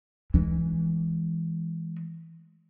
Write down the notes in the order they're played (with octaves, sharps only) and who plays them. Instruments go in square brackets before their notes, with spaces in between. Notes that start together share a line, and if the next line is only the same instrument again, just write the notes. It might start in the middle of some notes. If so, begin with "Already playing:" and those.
[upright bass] E3 G#3